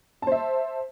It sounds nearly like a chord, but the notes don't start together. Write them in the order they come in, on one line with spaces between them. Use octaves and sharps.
A5 C5 E5